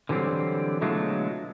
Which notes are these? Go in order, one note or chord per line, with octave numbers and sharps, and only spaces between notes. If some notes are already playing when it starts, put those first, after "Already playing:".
D3 E3 F#3 G3 C4
B2 D3 F#3 G#3 A3 F4